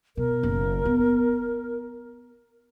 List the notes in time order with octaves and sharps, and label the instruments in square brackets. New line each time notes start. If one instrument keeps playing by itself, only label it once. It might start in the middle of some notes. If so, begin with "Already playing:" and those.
[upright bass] B2 [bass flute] A#4
[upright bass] F#1
B3